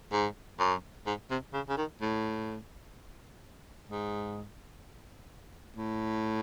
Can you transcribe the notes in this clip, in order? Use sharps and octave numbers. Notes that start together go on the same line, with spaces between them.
G#2
F#2
G#2
C3
C#3
C#3
D#3
A2
G#2
A2